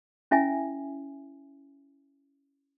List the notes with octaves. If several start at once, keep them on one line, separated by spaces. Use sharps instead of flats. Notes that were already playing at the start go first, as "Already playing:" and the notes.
C#4 E4 E5 G#5